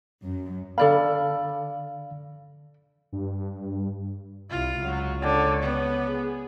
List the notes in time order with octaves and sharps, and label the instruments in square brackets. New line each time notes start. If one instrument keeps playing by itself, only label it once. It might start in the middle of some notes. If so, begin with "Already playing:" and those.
[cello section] F#2
[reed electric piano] D3 F5 [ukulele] A4 D5 B5
[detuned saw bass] G2
[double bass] C2 E4 [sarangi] F4
[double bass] C#2 [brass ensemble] F#3
[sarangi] D3 [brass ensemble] C#5
[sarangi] B3
[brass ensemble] G#4